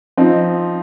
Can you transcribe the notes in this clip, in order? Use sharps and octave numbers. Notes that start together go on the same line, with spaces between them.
F3 C4 D#4